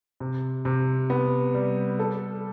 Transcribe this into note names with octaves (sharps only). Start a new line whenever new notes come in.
C3
C3
B3
G3
A4